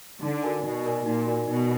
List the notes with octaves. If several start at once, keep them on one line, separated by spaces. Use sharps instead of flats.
D3 D#4
F#4 A#4 D5 G#5
B2 D#4
F#4 A#4 D5 G#5
A#2 D#4
F#4 A#4 D5 G#5
B2 D#4